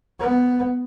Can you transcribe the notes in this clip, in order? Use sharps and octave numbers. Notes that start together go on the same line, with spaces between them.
B3